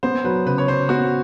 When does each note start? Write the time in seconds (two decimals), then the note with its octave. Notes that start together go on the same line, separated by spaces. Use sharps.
0.03 B3 C5
0.24 F#3 B4
0.46 C#3 B4
0.58 C#5
0.68 C#3 C5
0.89 B3 F#4